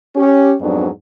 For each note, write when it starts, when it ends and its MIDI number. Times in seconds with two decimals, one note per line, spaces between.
0.16 0.54 61
0.16 0.54 67
0.61 0.88 41
0.61 0.88 44
0.61 0.88 54
0.61 0.88 59
0.61 0.88 62